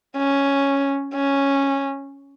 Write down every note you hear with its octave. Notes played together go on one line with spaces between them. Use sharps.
C#4
C#4